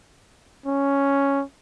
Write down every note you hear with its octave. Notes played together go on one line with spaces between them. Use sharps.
C#4